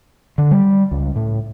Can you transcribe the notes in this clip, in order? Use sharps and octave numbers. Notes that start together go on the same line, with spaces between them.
D3
G3
C#2
A2